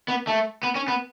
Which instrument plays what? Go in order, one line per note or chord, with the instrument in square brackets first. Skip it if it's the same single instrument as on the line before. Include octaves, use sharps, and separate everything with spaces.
[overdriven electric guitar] B3
A3
B3
C#4
B3